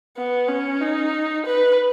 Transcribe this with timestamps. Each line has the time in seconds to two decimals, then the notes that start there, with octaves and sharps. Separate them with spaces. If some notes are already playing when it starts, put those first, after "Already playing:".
0.17 B3
0.48 C#4
0.81 D#4
1.46 B4